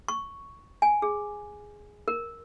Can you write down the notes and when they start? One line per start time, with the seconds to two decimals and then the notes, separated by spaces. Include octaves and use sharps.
0.08 C#6
0.82 G#5
1.02 G#4
2.08 A#4